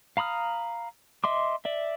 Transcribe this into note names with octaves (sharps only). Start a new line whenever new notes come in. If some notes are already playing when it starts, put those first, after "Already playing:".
F5 A#5 B5 D#6 F6
D#5 E5 C6 D6
D5 E5